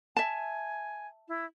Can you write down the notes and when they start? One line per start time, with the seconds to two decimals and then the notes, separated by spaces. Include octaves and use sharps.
0.17 E5 G#5 A5
1.28 E4